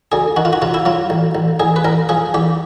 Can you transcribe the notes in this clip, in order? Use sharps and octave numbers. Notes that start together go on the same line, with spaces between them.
D2 G#4
D#3 F#4
F4
F#4
C3 F4
E4
F#3 F4
A1
A1
A1 G#4
B4
A1 A#4
F3 G#4
E2 G4